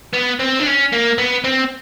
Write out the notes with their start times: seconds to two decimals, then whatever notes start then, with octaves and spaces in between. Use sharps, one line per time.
0.14 B3
0.40 C4
0.60 D4
0.66 C#4
0.92 A#3
1.18 B3
1.44 C4